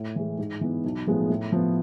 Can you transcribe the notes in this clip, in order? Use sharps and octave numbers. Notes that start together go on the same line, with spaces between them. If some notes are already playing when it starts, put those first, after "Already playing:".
Already playing: A2
E3 G#3
G#2
E3 B3
B1
A2 F3 G#3 B3
A2
F3 B3